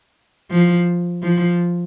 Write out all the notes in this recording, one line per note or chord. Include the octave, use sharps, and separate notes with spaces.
F3
F3